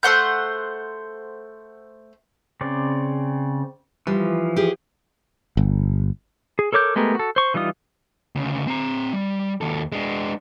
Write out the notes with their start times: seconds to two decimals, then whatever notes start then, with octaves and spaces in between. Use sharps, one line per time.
0.03 A3 C5 F#5 G6
2.61 C#3 C4 D5
4.07 E3 F3 G3
4.56 G4 G#4
5.57 G1
6.59 G#4
6.73 A4 A#4 C#5 D6 G6
6.96 G#3 A3 B3 G4 A#4
7.15 F#4 A4
7.36 C5 C#6
7.54 E3 G3 D#4 F4 D#6
8.35 D2 C#3
8.67 C4 A#5
9.13 G3
9.61 D#2 A4
9.92 G#3 D4